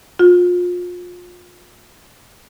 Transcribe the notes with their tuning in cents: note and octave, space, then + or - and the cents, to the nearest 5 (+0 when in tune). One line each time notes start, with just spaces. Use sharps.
F4 +30